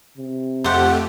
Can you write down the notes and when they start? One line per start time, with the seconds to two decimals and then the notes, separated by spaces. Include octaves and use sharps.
0.17 C3
0.64 F2 A3 G4 C5 F#5